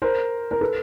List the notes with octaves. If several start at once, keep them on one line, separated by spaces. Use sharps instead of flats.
A#4 C5
A#4
A4 B4